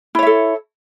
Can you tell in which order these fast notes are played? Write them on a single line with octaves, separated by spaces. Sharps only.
E4 C#5 E5 A4